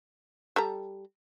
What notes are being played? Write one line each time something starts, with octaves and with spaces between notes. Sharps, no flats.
G3 A4 A#5